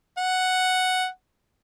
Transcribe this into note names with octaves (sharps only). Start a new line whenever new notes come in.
F#5